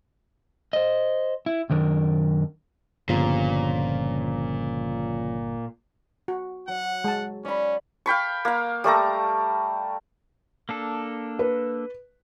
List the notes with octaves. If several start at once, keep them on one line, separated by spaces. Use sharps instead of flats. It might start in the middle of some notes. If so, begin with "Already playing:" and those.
C5 D#5
E4
F#2 D#3 D4 A#4
G1 A#2 C#3 F3 F4
F#4
F#3 F#5
G#3 A5
C#4 D5 B5
F5 G5 B5 C#6
A#3 F5
G3 A3 A4 A#5
A#3 D4 A4
B4